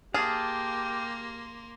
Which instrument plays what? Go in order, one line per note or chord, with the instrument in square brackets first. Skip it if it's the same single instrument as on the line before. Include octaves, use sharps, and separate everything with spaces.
[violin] A#3 C6 [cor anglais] G4 [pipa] G#4 [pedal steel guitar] F5 A5